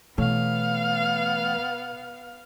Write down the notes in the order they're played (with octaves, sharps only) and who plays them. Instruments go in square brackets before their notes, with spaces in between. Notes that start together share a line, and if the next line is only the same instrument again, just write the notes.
[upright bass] B2 [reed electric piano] E3 A3 C#5 [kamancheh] B3 F5